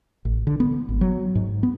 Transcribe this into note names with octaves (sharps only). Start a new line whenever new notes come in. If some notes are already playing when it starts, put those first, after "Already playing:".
A1
D3
B3
G#1
F#3
G#2
B3